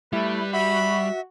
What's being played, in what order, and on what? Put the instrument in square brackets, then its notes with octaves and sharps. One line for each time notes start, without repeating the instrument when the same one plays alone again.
[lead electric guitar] G3 [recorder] A3 [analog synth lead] E4 [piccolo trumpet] B4
[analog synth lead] F#4 [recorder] E5 [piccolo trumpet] B5